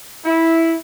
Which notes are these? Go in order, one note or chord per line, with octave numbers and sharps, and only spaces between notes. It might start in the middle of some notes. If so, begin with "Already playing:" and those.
E4